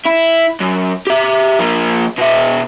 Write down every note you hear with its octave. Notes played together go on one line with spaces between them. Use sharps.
E4
F#2
G4 E5
F3 A#3
B2 E5